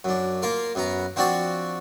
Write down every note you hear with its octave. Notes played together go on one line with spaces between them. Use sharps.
F#2 D4
A#3 F4 A#4
F#2 B3 A#5
F3 C4 D4 F#4 D5